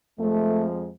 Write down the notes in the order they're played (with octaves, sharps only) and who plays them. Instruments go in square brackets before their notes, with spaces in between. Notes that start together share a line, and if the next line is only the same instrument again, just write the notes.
[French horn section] F2 F3 G#3 A3